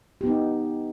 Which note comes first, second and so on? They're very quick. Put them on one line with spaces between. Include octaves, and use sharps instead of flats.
G4 B3 D#4